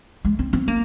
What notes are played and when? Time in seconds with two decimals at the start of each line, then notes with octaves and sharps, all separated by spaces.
0.25 G#3
0.39 C4
0.53 C4
0.68 A#3